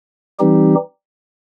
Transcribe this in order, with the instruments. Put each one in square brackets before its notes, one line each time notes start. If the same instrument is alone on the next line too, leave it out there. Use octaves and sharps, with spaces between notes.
[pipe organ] E3 G3 C4 D#4 G4